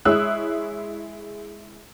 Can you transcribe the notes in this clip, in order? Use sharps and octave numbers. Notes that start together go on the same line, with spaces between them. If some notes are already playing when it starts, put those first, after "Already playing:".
G#3 E4 C#5 D#6 E6 F#6